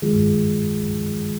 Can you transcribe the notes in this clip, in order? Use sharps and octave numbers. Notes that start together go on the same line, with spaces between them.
D#3 G#3 F4 G#4